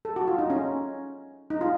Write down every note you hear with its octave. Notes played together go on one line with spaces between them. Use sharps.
A4
F#4
F4
D#4
C#4
D#4
F4